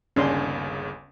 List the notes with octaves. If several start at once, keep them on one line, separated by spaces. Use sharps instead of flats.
G1 D#2 C#3 C#4 D4 C6